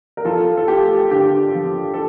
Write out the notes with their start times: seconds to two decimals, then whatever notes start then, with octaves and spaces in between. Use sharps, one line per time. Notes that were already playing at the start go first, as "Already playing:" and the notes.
0.17 A#4
0.25 F3 F4 A4
0.57 A4
0.68 A3 G4
1.11 D3 G4
1.55 F3
1.94 A4